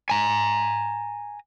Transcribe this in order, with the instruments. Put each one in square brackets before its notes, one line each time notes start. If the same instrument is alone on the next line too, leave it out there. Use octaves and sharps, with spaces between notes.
[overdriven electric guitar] G#5 A#5